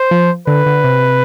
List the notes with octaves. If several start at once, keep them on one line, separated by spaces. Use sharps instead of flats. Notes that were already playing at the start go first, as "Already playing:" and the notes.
Already playing: C5
F3
D3 B4
D3
C3